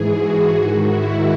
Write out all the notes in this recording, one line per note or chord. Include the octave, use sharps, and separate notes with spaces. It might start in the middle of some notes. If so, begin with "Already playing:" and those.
Already playing: G#2 E3 G#4
F#4
G#2
D#3
E4